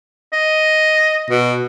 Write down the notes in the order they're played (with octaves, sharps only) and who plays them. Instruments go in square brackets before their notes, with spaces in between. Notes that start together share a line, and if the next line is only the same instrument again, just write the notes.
[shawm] D#5
[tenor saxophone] B2